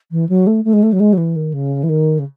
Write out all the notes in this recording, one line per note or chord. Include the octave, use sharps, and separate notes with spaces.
E3
F#3
A3
A3
G#3
A3
F#3
G#3
F#3
E3
D#3
C#3
E3
D#3
C#3